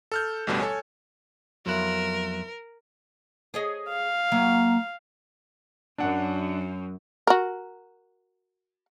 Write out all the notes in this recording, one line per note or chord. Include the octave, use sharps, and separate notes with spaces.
A4 F6 G6
A1 D2 B2 D3 G3
A4 C#5 G#5
F2 F#3 B3 E4 A#4 F#6
G#4 C#5 D#5
F5
F#3 A#3 E5
F#2 D4 F#5
F#4 A#4